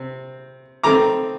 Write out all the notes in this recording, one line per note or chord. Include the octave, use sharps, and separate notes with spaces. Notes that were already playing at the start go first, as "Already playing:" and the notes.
Already playing: C3 C4
D#3 A3 C4 A#5 D6